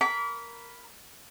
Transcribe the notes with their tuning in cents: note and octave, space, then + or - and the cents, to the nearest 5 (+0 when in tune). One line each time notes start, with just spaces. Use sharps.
A#4 +0 B5 +0 D6 -35